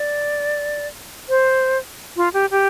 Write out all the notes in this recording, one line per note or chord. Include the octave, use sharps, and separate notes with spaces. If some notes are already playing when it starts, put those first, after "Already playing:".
Already playing: D5
C5
F4
G4
G4